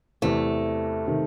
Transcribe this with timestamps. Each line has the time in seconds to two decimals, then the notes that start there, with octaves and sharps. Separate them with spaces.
0.22 E2 C3 E3 A3
1.07 C3 D#3